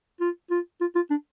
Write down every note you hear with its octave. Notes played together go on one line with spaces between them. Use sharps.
F4
F4
F4
F4
D4